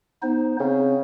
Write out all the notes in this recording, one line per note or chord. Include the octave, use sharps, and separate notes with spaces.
B3 D#4 C5
C#3 C4